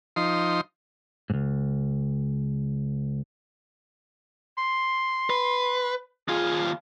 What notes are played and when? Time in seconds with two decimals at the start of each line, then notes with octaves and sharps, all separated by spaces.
0.16 F3 D#4 C6
1.30 C#2 G#2
4.58 C6
5.30 B4
6.28 D#2 F4 G#4